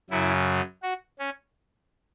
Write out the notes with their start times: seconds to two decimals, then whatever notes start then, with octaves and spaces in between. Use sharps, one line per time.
0.10 F#2 C#3 F#3 E4
0.82 F#4
1.19 C#4